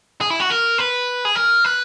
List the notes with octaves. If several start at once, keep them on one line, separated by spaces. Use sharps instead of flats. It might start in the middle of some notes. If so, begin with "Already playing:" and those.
G#4
E4
F#4
A#4
B4
G#4
A#4
B4